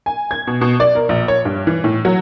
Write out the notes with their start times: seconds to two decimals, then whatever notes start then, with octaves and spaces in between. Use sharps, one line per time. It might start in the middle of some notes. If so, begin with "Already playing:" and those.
0.06 G#5
0.31 G#6
0.47 B2
0.61 B2
0.80 D5
0.95 A#4
1.09 A#1
1.28 C#5
1.45 G2
1.67 E3
1.84 A2
2.05 F#3